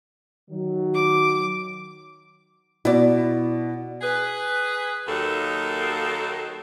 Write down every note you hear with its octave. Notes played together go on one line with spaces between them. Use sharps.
D#3 F#3
D6
B2 E4 D5
G#4 B4
D#2 F#3 A#3 D#4 A4